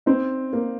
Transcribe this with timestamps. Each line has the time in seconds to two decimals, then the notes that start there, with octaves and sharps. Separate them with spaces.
0.06 C4 D#4
0.53 A#3